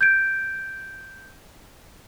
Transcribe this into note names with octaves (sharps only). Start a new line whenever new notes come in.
G6 G#6 D7